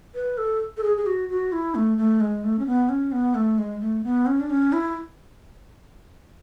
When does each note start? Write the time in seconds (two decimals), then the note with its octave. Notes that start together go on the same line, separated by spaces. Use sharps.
0.15 B4
0.38 A4
0.77 A4
0.83 G#4
0.97 G#4
1.06 F#4
1.29 F#4
1.52 E4
1.75 A3
1.98 A3
2.20 G#3
2.44 A3
2.59 C#4
2.67 B3
2.89 C#4
3.12 B3
3.35 A3
3.58 G#3
3.80 A3
4.04 B3
4.26 C#4
4.40 D4
4.50 C#4
4.73 E4